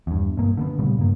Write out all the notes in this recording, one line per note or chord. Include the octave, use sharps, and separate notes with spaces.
E2 G2
B1 G2 A#3
D3 A3 B3
D2 A#2 C#3 G3
G2 A#3